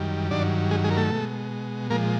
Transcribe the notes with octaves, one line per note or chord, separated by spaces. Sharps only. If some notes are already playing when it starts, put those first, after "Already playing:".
Already playing: F#2 D#3 G3
G2 D#3 F#3 D4 D5
G#3 G#4
G#3 G#4
A#4
A3 A4
B2 G#3
A#2 F3 G#3 A#3 A#4